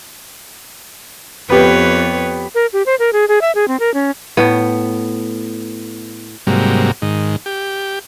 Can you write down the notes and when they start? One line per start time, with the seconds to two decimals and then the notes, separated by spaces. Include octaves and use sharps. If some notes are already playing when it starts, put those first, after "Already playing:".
1.50 F2 B3 G4 B4 C#5
2.55 A#4
2.73 G4
2.86 C5
2.99 A#4
3.13 G#4
3.28 G#4
3.41 E5
3.55 G#4
3.68 C4
3.80 A#4
3.94 C#4
4.37 A2 B3
6.47 G#2 C3 F#3 G3 A#3
7.02 G#2 D#3
7.46 G4